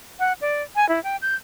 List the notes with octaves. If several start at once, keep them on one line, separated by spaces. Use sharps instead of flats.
F#5
D5
G#5
E4
G5
G6